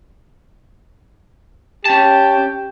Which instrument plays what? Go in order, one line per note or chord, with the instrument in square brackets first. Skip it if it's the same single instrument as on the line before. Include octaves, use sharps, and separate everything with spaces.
[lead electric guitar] C#4 A5 [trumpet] G4